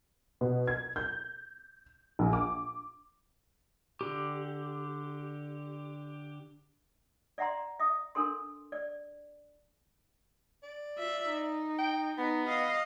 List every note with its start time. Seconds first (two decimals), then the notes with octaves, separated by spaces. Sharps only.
0.41 B2
0.67 G#6
0.96 G6
2.19 A#1
2.33 D6
4.01 D3 G4
7.38 D5 E5 F#5 A#5 C6
7.80 E5 D#6
8.15 D4 A4 A#4 C6
8.72 D5
10.63 D5
10.98 F4 E5
11.29 D#4
11.79 G5
12.18 B3 D#4
12.47 D#5 F5